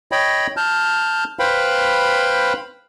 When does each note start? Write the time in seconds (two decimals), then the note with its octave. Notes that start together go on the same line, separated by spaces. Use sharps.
0.12 C#5 D#5 G5 B5
0.57 A5 F6 G6
1.39 B4 C5 F5 G5 B5